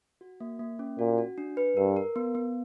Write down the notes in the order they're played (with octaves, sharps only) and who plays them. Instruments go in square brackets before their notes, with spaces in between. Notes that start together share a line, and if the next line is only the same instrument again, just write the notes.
[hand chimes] F#4
A#3
A#3
C#4
[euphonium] A#2 [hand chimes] F#4
[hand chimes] F#4
D4
B4
[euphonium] G2 [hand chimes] A#4
[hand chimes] A#4
B3
B3